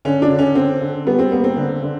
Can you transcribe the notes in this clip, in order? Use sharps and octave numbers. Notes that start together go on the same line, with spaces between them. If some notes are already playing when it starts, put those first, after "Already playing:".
D3 C#4
D4
D3
C#4
D3 C4
D3
G3 B3
C4
A#3 B3
C4
D3
D3